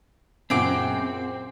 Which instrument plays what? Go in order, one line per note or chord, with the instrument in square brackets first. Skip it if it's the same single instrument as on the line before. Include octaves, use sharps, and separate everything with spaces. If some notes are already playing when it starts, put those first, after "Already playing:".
[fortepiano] F#2 A#2 C#3 [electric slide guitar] C4 [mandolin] G#4 F#5 D6